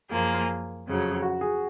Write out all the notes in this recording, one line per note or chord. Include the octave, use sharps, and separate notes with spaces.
F#2 F3 A#3 F4 G#4
F2 C#3 F#3
F#4
G#4